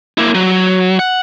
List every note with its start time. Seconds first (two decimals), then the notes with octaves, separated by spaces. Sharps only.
0.18 A#3 E4
0.34 F#3
0.99 F#5